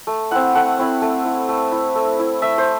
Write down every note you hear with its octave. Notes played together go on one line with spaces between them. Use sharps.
A3
C4 E4 F#5
A3 F#5
C4 E4
A3
E4
A3
E4
A3
E4
A3 E5
C5